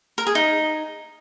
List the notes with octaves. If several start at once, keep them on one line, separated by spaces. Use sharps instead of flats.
A#4
G#4
D#4